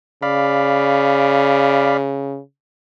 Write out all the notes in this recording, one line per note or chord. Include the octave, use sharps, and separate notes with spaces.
C#3 D5 F5 B5